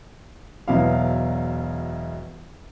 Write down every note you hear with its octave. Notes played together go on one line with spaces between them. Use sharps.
E1 B2 F#3 E4 F5